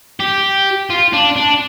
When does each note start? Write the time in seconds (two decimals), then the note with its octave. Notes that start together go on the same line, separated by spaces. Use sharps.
0.20 G4
0.90 F4
1.13 D4
1.36 D4